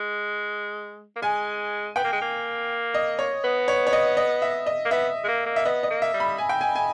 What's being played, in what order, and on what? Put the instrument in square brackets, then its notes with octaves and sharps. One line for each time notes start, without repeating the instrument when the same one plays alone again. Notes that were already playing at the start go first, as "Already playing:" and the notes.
Already playing: [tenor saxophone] G#3
A#3
[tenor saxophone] G#3 [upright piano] G#5
[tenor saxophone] B3 [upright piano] G5
[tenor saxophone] A#3
G#3
A#3
[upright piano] D#5
C#5
[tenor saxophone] B3
[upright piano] C#5
C#5
D#5
D#5
E5
D#5
[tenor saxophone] A#3
[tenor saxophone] B3 [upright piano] E5
[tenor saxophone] G#3
A#3
A#3
[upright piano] E5
[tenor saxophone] B3 [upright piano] D#5
[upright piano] D#5
[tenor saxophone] A#3
[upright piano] E5
[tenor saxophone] G3
[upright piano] B5
G#5
G5
G#5
G#5